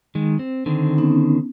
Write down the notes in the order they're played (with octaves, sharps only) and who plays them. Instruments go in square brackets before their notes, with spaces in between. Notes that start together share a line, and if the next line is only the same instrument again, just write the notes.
[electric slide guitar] D#3 G#3
C4
D3 D#3 C4
[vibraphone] B3 C#4 D#4